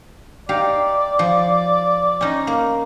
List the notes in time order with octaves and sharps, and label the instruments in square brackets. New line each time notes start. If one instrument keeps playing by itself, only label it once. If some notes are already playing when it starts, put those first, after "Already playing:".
[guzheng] D#4 G4 F5 [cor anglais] D5
[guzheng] F3
C#4 D#4
A#3